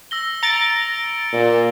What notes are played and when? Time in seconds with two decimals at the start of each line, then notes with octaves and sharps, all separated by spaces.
0.11 E6 A#6 G7
0.43 A#5 A6 C#7 D7
1.33 A#2